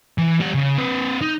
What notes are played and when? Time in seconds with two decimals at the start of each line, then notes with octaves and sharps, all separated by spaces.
0.18 E3
0.40 G3 F#5
0.54 C#3
0.78 C4 B4
1.21 D#4